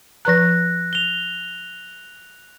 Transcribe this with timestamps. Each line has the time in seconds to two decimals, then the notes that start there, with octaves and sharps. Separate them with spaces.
0.25 F3 B4 A#5 F#6 A#6
0.93 F7 G7